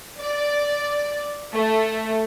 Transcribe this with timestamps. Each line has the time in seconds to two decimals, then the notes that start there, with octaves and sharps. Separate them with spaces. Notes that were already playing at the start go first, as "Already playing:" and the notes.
0.19 D5
1.53 A3